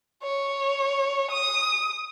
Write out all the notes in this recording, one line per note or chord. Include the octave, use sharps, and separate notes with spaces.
C#5
D#6